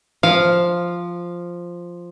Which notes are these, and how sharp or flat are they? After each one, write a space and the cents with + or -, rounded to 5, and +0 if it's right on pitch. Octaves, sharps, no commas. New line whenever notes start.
F3 +0 F5 +0